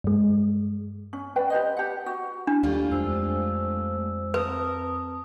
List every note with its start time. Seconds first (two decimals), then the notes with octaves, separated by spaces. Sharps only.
0.04 G2 G#3
1.13 C#4
1.36 B4 D5 G5
1.50 G4 B4 C5 D#5
1.77 G4 F#5
2.06 F#4
2.47 D4 E4
2.63 D#2 G3 A3 F4
2.91 F2 G#3 C5 E6
4.34 C4 A#4 B4 A5 D#6